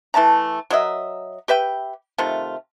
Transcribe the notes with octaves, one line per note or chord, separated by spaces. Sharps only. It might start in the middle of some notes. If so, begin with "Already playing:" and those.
E3 A3 A5 A#5
F#3 A#4 D#5 E5
G4 B4 E5 G5
C3 D#3 A3 F4